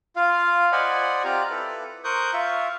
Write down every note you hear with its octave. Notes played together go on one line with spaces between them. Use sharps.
F4 F5
C5 D5 D#5 F#5 G#5 B5
C4 F4 G4 D5 F5 A#5
E4 A4 B4
A#4 C5 C#6 D#6 F#6 G6
F4 E5 F5 C#6